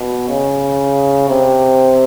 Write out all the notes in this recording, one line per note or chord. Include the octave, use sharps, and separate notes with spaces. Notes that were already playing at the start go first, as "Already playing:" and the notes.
Already playing: B2
C#3
C3